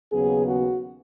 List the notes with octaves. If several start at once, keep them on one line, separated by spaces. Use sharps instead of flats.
D#2 C#3 F#3 B3 G#4
F#4